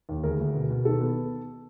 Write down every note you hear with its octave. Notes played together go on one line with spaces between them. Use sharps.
D#2
D2 G#4 A#4
D2
B2
B2
D#3 A4
B3